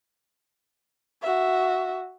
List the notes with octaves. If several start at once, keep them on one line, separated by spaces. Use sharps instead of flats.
F#4 E5